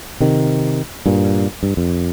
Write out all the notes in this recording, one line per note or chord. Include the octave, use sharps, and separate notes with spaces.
C3 D#3
G2 A#2
G2
F2